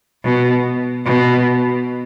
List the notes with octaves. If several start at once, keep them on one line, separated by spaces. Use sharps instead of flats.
B2
B2